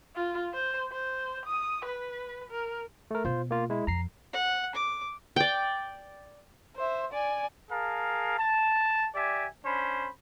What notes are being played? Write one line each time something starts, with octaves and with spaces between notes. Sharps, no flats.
F4
C5
C5
D#6
B4
A#4
A3 A#4
B2 F4 C5
A#3 F4
G#3 E4
F2 A#5 C7
F#5
D6
D5 G5
C5 E5
D5 G#5
G#4 A#4 F5 A5
A5
G4 D5 E5 G#5
C#4 D4 C5 B5